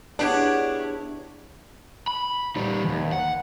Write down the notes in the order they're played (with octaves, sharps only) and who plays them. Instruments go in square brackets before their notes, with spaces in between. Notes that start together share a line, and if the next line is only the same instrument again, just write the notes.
[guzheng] B3 G4 G#4 [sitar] D4 [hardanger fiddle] E4 C#5
[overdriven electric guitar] B5
G3 D#4
D#2 E3
F#5